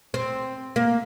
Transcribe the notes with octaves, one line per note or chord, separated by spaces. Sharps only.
C4
A#3